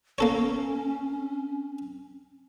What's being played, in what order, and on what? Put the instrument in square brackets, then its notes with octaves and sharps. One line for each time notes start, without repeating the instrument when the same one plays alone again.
[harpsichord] A#3 A4 C#5 [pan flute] C#4